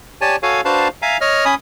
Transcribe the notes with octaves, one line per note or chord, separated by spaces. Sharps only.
G4 C#5 D5 G#5 A5
F#4 A4 C#5 F5 G#5
D4 F#4 B4 C5 F5 A5
E5 F5 G#5 A#5
C#5 D#5 F6
C#4 G#5 B5 D#6